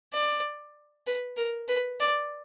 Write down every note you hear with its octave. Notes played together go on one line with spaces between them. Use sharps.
D5
B4
A#4
B4
D5